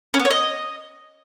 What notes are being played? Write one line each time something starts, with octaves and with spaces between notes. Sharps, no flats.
C#4
B3
C#5
D#5